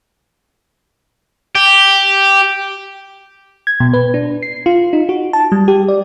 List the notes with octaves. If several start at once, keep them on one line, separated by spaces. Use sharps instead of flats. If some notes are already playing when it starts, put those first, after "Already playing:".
G4
G#6
B2
B4
D4
C7
F4
D#4
F#4
A5
G3
G4
D5